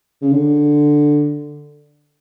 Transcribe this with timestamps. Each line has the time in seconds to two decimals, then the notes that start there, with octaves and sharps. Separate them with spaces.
0.22 C#3
0.32 D3